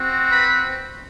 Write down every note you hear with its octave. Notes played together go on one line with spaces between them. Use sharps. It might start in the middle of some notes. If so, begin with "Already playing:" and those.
Already playing: C4 F#4
B4 B5